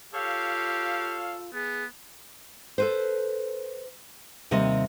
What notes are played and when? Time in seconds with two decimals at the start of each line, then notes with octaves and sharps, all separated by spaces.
0.14 F4 G4 A4 C#5 F5
1.53 B3 G#4
2.78 A4 B4 C5
4.51 D#2 C3 G3 D#5